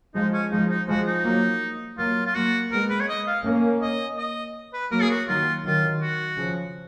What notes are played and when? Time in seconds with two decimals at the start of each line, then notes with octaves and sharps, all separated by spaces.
0.15 F3 G#3 D#4
0.33 C#4
0.51 F3 G#3 D#4
0.70 D#4
0.88 F3 G#3 F#4
1.07 D#4
1.25 F#3 A#3
1.98 F#3 A#3 F4
2.26 F4
2.35 F#3 A#3 F#4
2.72 G#3 B3 A#4
2.90 B4
3.00 C#5
3.09 D#5
3.27 F5
3.44 A#3 C#4
3.82 D#5
4.18 D#5
4.73 B4
4.91 F#3 A#3 A#4
5.02 G#4
5.10 F#4
5.27 D#3 F#3 F4
5.64 D#3 F#3 F4
6.01 F#4
6.38 C#3 F3